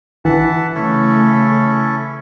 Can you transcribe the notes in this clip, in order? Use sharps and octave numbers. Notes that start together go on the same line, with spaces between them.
E3 E5 F#5 A5
C#3 A3 C#4 E4 A4